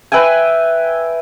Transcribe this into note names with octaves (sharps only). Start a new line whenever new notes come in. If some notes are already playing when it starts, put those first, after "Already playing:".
B4 E5 G5 G#5